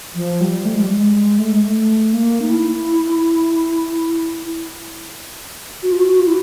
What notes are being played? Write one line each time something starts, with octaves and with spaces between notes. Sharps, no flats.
F3
G3
A3
G#3
G3
G#3
A3
G#3
A3
A#3
D#4
E4
F#4
F4
F#4
F4
E4